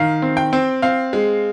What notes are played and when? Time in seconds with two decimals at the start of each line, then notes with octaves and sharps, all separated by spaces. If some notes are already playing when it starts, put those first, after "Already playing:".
Already playing: D#3 F5
0.22 C4
0.37 G5
0.53 C4
0.82 C4 F5
1.13 G#3